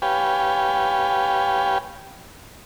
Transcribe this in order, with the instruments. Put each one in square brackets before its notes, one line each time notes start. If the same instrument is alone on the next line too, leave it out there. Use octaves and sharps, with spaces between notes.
[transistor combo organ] G4 B4 C#5 F5 G5 G#5